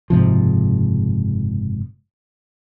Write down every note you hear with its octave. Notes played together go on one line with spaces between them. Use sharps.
F#1 G#2 C3 F3